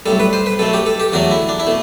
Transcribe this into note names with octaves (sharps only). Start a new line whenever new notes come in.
B1 A2 G3 A4
B4
C5
B4
B1 B2 A3 A4
G4
A4
G4
E2 D3 F#3 A3 F#4
E4
D4
E4
B2 A3